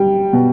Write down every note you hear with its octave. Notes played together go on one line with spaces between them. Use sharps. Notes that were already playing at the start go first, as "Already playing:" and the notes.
Already playing: G3 G5
B2